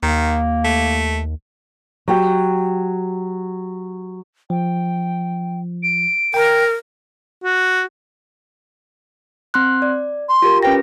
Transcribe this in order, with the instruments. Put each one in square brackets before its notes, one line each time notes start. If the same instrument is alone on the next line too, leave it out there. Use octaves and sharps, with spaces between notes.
[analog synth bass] D#2 [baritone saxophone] D#3 [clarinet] A#3
[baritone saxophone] A3
[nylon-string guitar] F#3 G4 G5
[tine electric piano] F3 [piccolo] G5
[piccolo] D7
[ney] A#4 [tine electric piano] G5 A#5
[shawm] F#4
[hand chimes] C4 C6 F#6
D5
[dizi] C6
[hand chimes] F4 G4 A#4
[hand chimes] C#4 B4 A#6 [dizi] G5